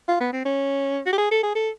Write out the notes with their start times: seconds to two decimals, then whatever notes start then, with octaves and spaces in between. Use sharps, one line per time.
0.08 F4
0.20 B3
0.33 C4
0.45 C#4
1.06 F#4
1.13 G4
1.18 G#4
1.31 A4
1.43 G#4
1.55 A4